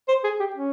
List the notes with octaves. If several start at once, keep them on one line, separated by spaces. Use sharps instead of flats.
C5
G#4
G4
C#4